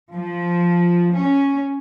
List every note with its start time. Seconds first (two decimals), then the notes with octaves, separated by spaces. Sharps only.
0.12 F3
1.15 C#4